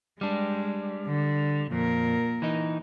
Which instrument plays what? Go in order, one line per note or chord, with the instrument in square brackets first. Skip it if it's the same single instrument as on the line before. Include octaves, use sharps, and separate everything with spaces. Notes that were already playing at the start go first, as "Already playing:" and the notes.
[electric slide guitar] G3 D4 [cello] G#3
[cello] D3
[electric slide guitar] F2 [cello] A#2 A#4
[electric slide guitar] E3 D#4